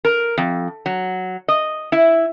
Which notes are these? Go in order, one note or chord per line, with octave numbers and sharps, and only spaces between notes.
A#4
F2
F#3
D#5
E4